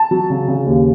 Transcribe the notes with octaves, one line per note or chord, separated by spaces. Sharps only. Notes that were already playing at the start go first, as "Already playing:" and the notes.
Already playing: A5
F#3
C#3
C#3
D#2